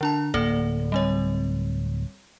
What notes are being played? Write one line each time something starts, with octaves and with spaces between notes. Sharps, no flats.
D3 D4 A5
D1 A#3 A4 D5
G3 C4 C#5